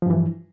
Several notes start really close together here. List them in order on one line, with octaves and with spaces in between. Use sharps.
F3 G2 E3